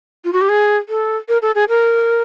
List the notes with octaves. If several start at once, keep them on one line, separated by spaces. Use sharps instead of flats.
F4
F#4
G4
G#4
A4
A#4
A4
G#4
A#4